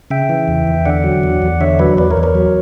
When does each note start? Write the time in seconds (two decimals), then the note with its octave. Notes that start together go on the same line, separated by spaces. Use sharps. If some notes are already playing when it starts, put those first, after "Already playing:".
0.11 C#3 E5 G5
0.29 E3
0.48 E2
0.67 E2
0.86 D3 D5 F#5
1.04 F#3
1.23 E2
1.42 E2
1.60 D3 C#5 E5
1.79 F#3 B4 D5
1.98 E2 B4 D5
2.10 A#4 C#5
2.17 E2
2.23 A#4 C#5
2.35 F#3